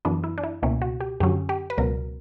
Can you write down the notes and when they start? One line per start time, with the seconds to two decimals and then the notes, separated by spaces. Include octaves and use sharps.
0.05 F#2 E3 B3 D4
0.24 E4
0.38 D4
0.44 E4
0.62 C#2 B2 A#3 C#4 E4
0.82 F#4
1.00 G4
1.20 F#2 D3 F#3 C#4 G4
1.49 G4
1.70 B4
1.78 C#2 B2 F#3 A#4